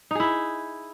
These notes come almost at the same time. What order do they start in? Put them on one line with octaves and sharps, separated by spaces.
D#4 G#4 E4